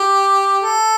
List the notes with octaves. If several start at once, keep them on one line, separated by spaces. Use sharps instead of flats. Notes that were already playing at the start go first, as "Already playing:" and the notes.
Already playing: G4
A4